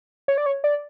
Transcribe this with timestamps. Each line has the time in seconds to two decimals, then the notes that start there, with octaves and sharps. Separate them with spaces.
0.28 C#5
0.38 D5
0.46 C#5
0.64 D5